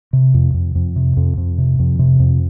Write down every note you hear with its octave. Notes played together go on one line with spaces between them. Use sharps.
C3
F2
F2
F2
C3
F2
F2
C3
F2
C3
F2